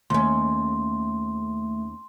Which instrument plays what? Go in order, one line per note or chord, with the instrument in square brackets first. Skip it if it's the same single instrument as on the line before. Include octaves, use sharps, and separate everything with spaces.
[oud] D#2 C#4 [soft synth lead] A3 [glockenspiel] C6